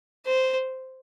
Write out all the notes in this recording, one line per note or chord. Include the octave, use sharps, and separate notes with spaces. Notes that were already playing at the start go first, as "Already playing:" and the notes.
C5